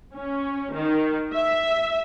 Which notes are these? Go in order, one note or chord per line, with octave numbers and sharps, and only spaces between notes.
C#4
D#3
E5